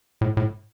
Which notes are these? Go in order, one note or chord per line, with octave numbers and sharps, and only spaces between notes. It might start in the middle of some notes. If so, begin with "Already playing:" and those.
A2
A2